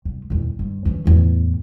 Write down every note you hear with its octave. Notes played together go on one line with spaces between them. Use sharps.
C2
D#1 E2
G2
E3 C#4
E2 A2